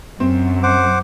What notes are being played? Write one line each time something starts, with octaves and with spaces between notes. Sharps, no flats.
F#2 C4
C5 F#5 D6